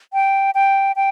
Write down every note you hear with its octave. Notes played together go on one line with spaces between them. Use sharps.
G5
G5
G5